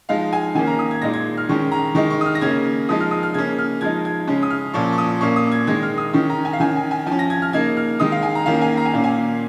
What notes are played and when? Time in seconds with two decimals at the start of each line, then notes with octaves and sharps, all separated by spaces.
0.09 F3 G#3 D#4 F5
0.33 G#5
0.55 D#3 A#3 C#4 G#5
0.67 A#5
0.79 D#6
0.91 G#6
1.02 A#2 G#3 D#4 A#6
1.14 G#6
1.37 F6
1.49 D#3 G#3 C#4 C#6
1.71 A#5
1.95 D#3 G#3 D#4 C#6
2.10 C#6
2.21 D#6
2.26 F6
2.35 A#6
2.41 C#3 A#3 C#4 G#6
2.89 F3 G#3 D#4 D#6
3.00 F6
3.11 D#6
3.23 F6
3.34 C#3 A#3 C#4 G#6
3.59 F6
3.81 F3 G#3 D#4 G#6
4.05 G#6
4.28 C#3 G#3 C#4
4.43 D#6
4.50 F6
4.74 A#2 F3 C#4 C#6
4.92 C#6
4.98 D#6
5.21 A#2 A#3 C#4 C#6
5.36 D#6
5.52 G#6
5.67 D#3 G#3 D#4 G#6
5.83 F6
5.98 D#6
6.13 D#3 C#4 C#6
6.30 A#5
6.45 G#5
6.53 F5
6.60 D#3 C#4 G#5
6.76 G#5
6.91 G#5
7.06 F3 G#5
7.12 C#4
7.19 A#6
7.30 G#6
7.42 F6
7.53 C#3 A#3 D#4 G#6
7.77 F6
8.00 D#3 G#3 D#4 D#6
8.12 F5
8.23 G#5
8.35 A#5
8.46 D#3 A#3 C#4 F5
8.54 A#5
8.61 G#5
8.77 A#5
8.85 G#5
8.93 A#2 A#3 C#4 F5
9.04 G#5